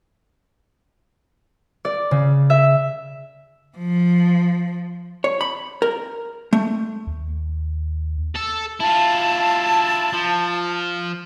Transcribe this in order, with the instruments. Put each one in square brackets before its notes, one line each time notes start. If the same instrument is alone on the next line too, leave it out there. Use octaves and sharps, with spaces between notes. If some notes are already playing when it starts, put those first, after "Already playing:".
[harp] D5
C#3
E5
[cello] F3
[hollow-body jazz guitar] C#5
B5
A#4
A3
[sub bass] D#2
[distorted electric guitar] A4
[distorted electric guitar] E4 F4 [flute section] A5
[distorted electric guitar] F3